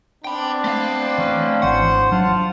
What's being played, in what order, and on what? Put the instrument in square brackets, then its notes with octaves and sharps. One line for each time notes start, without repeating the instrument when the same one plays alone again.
[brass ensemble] B3 C4 D4 [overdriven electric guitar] G5 B5
[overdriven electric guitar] A3 F5
[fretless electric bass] E3 [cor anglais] C#4
[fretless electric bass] G#1 E3 [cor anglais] C5 [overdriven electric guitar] F#5
[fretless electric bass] F#3 D4 [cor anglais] F4 [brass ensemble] A5